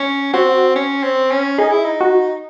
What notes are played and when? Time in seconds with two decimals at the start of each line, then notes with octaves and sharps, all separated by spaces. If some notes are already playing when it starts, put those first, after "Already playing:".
Already playing: C#4
0.33 C4 F#4
0.76 C#4
1.03 C4
1.31 C#4
1.58 D#4 G#4
1.71 E4
1.84 D#4
2.01 F#4